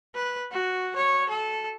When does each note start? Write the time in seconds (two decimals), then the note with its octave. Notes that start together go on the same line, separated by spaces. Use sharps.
0.15 B4
0.51 F#4
0.96 C#5
1.30 A4